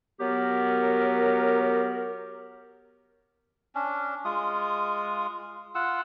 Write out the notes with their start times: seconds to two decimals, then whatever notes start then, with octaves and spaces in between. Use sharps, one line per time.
0.20 F#3 B3 G4 A#4
3.75 C#4 D4
4.25 G#3 F4 D#6
5.75 F4 F#5 E6